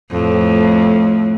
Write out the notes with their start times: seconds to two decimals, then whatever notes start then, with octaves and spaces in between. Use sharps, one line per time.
0.11 F2 A2